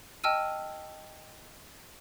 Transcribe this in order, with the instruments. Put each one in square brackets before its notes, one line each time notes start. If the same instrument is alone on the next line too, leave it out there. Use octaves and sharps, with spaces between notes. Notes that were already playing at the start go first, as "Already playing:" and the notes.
[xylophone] D#5 G5 A5 E6 F6 D#7